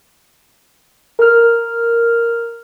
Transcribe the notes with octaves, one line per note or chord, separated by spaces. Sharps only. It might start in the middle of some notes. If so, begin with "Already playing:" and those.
A#4 F6